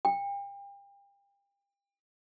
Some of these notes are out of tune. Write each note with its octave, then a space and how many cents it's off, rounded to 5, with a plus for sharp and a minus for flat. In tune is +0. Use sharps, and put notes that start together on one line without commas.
G5 +35